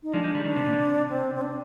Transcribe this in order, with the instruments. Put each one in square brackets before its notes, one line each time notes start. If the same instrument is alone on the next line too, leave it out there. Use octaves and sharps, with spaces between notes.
[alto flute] D#4
[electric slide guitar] F3 G#3 [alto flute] D4
[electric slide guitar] F3 G#3
D#3 G3
[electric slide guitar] D#3 [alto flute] D4
[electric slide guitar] C3
A#2
D3
C3
[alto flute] C4
C4
D4